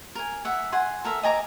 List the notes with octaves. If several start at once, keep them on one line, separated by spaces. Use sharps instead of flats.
A#4 G#5
E5 F#5
F#5 G#5 C6
A4 A#4 E5
D#5 G#5 A#5 D6